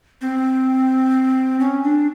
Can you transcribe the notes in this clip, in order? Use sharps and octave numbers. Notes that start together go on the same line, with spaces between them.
C4
C#4
D4